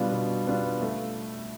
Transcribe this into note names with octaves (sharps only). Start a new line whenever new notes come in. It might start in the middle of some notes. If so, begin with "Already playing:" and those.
Already playing: B2 G3 B3 D4 F4
B2
G3 B3 D4 F4
A3